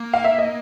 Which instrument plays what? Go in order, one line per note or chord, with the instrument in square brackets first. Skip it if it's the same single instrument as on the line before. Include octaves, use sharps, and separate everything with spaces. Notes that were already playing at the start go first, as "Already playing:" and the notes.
Already playing: [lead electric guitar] A#3
[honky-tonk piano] F5
E5
D#5